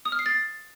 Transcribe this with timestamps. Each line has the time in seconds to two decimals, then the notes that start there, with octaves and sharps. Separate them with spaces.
0.05 D#6
0.12 F6
0.19 C7
0.26 A6